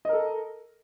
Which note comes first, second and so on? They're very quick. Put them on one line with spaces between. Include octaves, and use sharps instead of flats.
D#5 A#4 A4